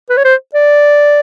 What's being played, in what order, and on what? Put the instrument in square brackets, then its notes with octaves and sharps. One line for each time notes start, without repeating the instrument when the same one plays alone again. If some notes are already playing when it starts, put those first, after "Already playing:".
[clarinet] B4
C#5
C5
D5